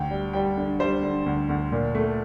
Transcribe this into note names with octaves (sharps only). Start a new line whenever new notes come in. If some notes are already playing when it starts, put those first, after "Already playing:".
Already playing: D2 G5
G3
G3 G5
D3
G3 C5
D3
D2
D2
A#2
A3